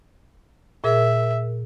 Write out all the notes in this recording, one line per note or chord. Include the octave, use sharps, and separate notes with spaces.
A#2 G#4 A#4 E5